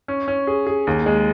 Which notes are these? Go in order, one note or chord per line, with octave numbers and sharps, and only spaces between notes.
C#4
C#4
G#4
G#4
D#2
G#3